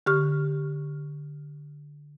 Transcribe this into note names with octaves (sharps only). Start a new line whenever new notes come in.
D3 G4 C#6 F6